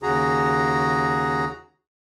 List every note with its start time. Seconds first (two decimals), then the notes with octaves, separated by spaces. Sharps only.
0.03 D#2 C#3 F#4 G#4 A#5